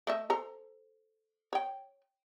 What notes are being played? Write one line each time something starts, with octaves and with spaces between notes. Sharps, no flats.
A3 D#5 E5
A4 C5 A#5
C#5 G5